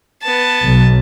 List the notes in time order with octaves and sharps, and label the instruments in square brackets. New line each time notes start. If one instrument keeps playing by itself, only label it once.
[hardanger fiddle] B3 A5
[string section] B1